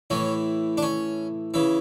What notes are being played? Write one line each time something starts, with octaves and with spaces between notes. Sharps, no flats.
A2 E3 C#4
D4
C#4
C#3 E3